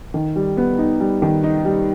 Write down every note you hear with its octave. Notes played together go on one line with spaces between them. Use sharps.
D#3
G3
B3
D#4
G3
D#3
D#4
G3